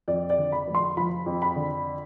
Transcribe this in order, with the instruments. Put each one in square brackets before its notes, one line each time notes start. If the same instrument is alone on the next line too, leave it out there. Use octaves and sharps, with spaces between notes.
[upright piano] F2 D5
D5
D3
B5
F1
C6
F3 B5
F2
B5
D3